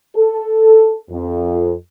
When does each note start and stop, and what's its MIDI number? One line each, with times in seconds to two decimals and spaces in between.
0.15 0.99 69
1.11 1.75 41